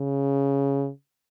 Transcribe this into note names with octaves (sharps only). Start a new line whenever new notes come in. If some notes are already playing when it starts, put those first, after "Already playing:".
Already playing: C#3